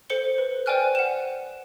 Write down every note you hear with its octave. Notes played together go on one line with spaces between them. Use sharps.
A4 C5 C#7 G7
B4
C5 D5 G5 G#5 F6 F#6
F#5 E7